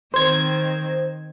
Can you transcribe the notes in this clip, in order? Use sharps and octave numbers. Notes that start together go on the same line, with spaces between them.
D#3 C4 C5 G#6